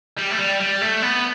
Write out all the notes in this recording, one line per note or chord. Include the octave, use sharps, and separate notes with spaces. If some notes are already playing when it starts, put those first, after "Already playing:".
G3
A3
G3
G3
A3
B3